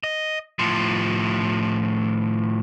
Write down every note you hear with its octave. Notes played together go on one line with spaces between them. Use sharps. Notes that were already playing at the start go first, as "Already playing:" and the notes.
D#5
A2 F3